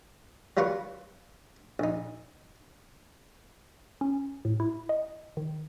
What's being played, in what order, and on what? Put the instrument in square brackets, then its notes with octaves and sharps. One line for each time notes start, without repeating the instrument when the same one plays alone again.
[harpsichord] F#3 G3 F4 A#4 B4 C#6
A#1 D#4
[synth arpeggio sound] C#4
A2
E4
D#5
D#3